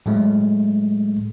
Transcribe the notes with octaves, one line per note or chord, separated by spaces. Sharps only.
A2 F#3 G#3 A3